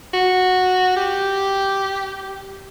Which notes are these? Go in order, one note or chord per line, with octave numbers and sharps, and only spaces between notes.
F#4
G4